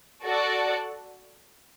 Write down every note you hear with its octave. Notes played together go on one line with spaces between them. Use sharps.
F#4 A4 D5 F#5